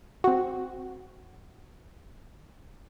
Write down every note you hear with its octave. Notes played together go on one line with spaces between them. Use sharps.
C4 F#4